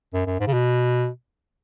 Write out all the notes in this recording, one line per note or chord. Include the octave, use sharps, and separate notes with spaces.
F#2
F#2
G#2
C#3
B2